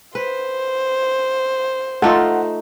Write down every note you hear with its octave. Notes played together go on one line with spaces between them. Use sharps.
B4 C5
A3 D#4 F4 A4 F#5